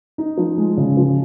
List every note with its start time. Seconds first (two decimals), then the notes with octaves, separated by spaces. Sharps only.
0.18 D#4
0.37 F3
0.57 G#3
0.77 C#3
0.97 F3